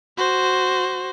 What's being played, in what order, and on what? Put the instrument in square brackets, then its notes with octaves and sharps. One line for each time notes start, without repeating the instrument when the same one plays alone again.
[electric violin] F#4 C5